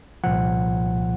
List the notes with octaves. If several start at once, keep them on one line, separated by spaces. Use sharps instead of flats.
C2 A#2 F3 F#5